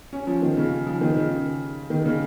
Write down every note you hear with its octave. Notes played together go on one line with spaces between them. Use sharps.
C#4
F3
D#3
C#3
F3
D#3
C#3
D#3
C#3